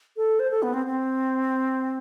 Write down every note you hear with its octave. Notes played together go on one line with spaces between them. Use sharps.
A4
C5
A4
B3
C4
C4